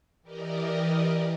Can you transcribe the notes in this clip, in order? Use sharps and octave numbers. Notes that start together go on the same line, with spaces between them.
E3 G4 A#4 D5 D#5